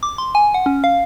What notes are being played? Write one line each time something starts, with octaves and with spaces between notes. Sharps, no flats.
D6
C6
G#5
F#5
C#4
F5